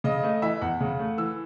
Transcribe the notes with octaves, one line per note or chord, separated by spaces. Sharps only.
C#3 D#5
A3 D#5
E3 E5
E2 F#5
C#3
A3
E3 E6